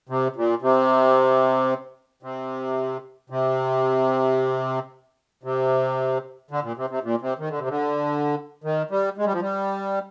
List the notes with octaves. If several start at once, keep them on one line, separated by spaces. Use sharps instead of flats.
C3
A#2
C3
C3
C3
C3
D3
A#2
C3
C3
A#2
C3
D#3
D3
C3
D3
D#3
G3
G#3
G3
F3
G3